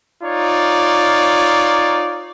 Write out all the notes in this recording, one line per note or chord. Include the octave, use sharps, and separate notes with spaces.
D#4 F4 C#5 D5